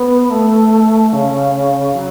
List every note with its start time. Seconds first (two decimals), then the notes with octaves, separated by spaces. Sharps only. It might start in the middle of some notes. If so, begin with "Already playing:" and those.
Already playing: B3
0.30 A3
1.13 C#3
1.95 F#3